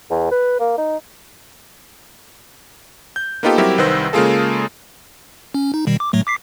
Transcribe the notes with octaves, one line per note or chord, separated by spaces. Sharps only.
E2
B4
A#3
D#4
G6
A#3 B3 D#4 F4 G4 A4
F#3 G3 C4 E4 G4 A#4
C2 D#3 B4 C5 E6 A#6
C#3 G#3 A#3 F4 G#4 A4
C#4
D#4
B2 D#3 G3
D6
A2 F#3 A3
D6 B6 C7